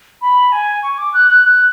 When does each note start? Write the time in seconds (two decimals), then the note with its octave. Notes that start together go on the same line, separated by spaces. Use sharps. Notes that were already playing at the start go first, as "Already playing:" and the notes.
0.22 B5
0.52 G#5
0.83 C#6
0.98 D6
1.14 F#6
1.29 F#6
1.44 F#6